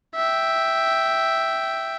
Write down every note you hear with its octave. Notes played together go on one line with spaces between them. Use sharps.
E5 G5